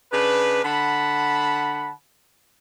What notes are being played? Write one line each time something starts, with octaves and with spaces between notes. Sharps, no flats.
C#3 D4 B4
D3 F#5 A5 B5